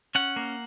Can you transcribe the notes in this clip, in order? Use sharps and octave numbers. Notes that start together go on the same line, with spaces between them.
C#4 F#5
A#3